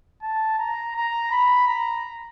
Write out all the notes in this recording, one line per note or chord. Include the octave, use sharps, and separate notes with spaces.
A5
A#5
A#5
B5
A#5